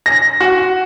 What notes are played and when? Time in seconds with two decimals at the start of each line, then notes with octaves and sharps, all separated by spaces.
0.06 A#6
0.40 F#4